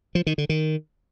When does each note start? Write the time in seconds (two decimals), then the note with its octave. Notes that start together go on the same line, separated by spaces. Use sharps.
0.15 F3
0.27 D#3
0.38 D3
0.49 D#3